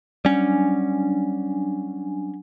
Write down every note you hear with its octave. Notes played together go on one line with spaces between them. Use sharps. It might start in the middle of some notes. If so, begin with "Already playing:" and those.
F#3 G3 C#4 D4 G#5